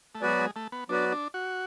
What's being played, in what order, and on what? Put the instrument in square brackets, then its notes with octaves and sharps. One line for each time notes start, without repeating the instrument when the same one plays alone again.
[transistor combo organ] A3
[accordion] F#3 B3 F#4 B4 D5 [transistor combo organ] G#3
[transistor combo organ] G#3
A3
B3
[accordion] F#3 B3 F#4 B4 D5 [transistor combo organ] D4
[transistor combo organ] D4
F#4